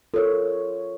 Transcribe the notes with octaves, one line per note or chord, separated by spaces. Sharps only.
F4 A4 A#4 C#5